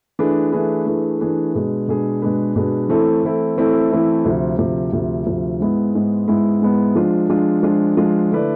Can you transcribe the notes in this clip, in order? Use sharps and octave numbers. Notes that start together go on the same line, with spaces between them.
E3 A3 D4 G#4 B4
E3 A3 D4 G#4 B4
E3 A3 D4 G#4 B4
E3 A3 D4 G#4 B4
B2 G#3 D4 G#4 B4
B2 G#3 D4 G#4 B4
B2 G#3 D4 G#4 B4
B2 G#3 D4 G#4 B4
E3 A3 C4 E4 A4
E3 A3 C4 E4 A4
E3 A3 C4 E4 A4
E3 A3 C4 E4 A4
D2 C3 F3
D2 C3 F3
D2 C3 F3
D2 C3 F3
G#2 G#3 B3 E4
G#2 G#3 B3 E4
G#2 G#3 B3 E4
G#2 G#3 B3 E4
F3 G#3 D4 F4
F3 G#3 D4 F4
F3 G#3 D4 F4
F3 G#3 D4 F4
D3 A3 E4 B4 D5